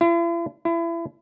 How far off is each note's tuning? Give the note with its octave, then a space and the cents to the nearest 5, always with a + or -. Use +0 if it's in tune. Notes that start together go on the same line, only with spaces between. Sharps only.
E4 +45
E4 +30